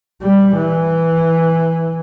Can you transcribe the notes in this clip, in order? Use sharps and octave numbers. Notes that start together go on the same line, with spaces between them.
G3
E3